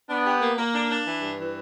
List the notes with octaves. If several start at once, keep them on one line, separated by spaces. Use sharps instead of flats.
B3 D4
G4
A#3
A#3
D4
D4
E3
G2
E3